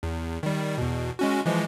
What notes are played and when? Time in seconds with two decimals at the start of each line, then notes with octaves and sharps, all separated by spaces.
0.03 E2
0.43 D#3 G3
0.78 E2 B2
1.19 G#3 C#4 F#4
1.46 E3 F3 G#3